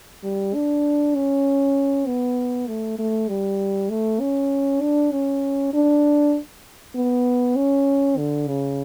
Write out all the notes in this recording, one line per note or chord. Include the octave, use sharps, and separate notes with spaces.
G3
D4
C#4
B3
A3
A3
G3
A3
C#4
D4
C#4
D4
B3
C#4
D3
C#3